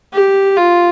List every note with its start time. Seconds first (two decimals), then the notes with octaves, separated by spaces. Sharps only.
0.13 G4
0.57 F4